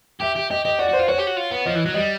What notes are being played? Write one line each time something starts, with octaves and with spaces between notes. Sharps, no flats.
G4 E5
G4
G4 D#5
G4 D#5
F#4 D5
F#4 C5
F4
F#4 C#5
G4
F#4
F4
B3
F3 D#5
E3
F#3
G3 D#5